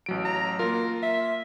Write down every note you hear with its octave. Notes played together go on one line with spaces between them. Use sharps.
A1 F#3 D7
A#5
A#3 F4 A#4
E5